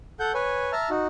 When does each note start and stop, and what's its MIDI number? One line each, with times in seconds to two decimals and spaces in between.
0.20 0.32 69
0.20 0.32 78
0.20 0.32 91
0.34 0.72 71
0.34 0.72 73
0.34 0.72 80
0.72 0.89 76
0.72 0.89 81
0.72 0.89 82
0.72 0.89 89
0.90 1.07 63
0.90 1.07 66